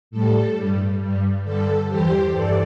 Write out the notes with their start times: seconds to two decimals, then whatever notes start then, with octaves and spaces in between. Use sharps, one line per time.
0.11 A2 G3 A4
0.55 G2 G3
1.00 G2 G3
1.44 G2 D3 G3 A4
1.88 E2 E3 G3 G4 C5
2.33 G2 E3 A4 D5